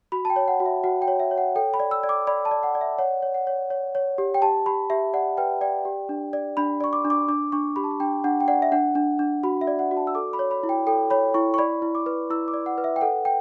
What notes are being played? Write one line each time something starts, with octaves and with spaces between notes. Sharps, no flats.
F#4 B5
A5
G5
C#5
F#5
F#4
E5
F#4 F#5
G5
C#5
E5
C#5
F#5
A4 G5
B5
D5
E6
D5
D6
D5 B5
A5
D5
F#5
D5
E5
C#5 F#5
C#5
F#5
C#5
C#5
C#5
G4
G5
G4 A5
G4 B5
G4 E5
D5 F#5
B4 G5
D5 G5
G4
D4
D5
D4 B5
D5 C#6
D6
D4
D6
D4 D6
D4 C#6
G4 B5
A5
B5
D4 G5
D4 F#5
G5
D5 F#5
E5
D4 F#5
D4
D4
F#4 B5
E5
D5
F#5
F#4
A5
E6
A4 D6
B5
C#5
B5
E4
G5
A4 G5
C#5 B5
E4 C#6
C#6
D5 B5
E4
D6
B4
E4 E6
D6
D5
F#5
B4
E5
G5
A4 F#5
G5